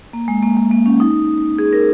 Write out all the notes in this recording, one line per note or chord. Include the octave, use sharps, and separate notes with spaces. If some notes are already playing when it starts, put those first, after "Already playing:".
A#3
G#3
A#3
G#3
A#3
C#4
D#4
G#4
A#4